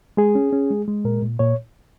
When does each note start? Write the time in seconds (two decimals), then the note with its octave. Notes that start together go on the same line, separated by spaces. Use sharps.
0.17 G#3 G#4
0.35 C#4
0.53 C#4
0.71 G#3
0.88 G#3
1.05 A#2 A#4
1.22 A#2
1.39 A#2 C#5